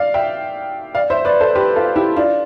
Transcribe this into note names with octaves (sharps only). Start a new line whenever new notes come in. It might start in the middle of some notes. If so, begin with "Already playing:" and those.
Already playing: D5 F5
E5 G5
D5 F5
C5 E5
B4 D5
A4 C5
G4 B4
F4 A4
E4 G4
D4 F4